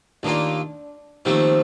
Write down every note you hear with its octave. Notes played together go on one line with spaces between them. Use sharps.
D#2 D#3 A#3 D4 F4
D#2 D#3 F3 A3 C4